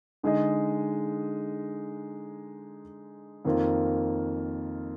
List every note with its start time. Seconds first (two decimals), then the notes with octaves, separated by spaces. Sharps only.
0.23 D3 G#3 D#4 G#4 D#5
3.45 F2 D#3 A#3 F4